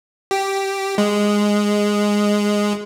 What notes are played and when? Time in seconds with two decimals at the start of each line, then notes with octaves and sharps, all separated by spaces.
0.31 G4
0.98 G#3